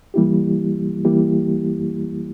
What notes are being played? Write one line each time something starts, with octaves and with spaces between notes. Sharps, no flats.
E3 G3 A#3 E4 G4
E3 G3 A#3 E4 G4